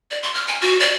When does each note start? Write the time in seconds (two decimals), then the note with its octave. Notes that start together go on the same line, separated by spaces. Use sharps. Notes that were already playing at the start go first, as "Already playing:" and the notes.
0.11 D5
0.23 C6
0.34 F6
0.48 G#5
0.61 F#4
0.80 D5